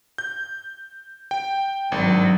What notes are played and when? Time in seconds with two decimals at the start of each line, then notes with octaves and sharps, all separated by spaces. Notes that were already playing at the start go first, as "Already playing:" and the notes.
0.18 G6
1.31 G5
1.92 G#1 G2 F#3